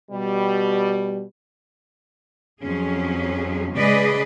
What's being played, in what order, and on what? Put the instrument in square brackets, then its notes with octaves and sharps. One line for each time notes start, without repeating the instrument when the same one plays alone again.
[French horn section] B2 G3
[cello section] F2 F#3 C#4 G#4
C#3 G#3 G#4 B4 D5 D#5